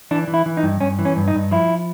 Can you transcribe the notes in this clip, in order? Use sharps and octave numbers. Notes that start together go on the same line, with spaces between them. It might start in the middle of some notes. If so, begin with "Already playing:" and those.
E3 D4
E3
E4
E3
D#4
G2
G2 C#4
E3
C#4
G2
D#4
G2
F3 E4